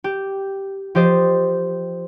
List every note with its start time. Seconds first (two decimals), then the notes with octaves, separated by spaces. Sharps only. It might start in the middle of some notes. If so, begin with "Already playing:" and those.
0.04 G4
0.95 F3 G4 C5 D#5 A6 E7